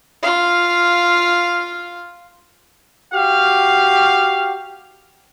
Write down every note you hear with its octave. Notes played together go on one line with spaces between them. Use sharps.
F4 F5
F#4 G4 F5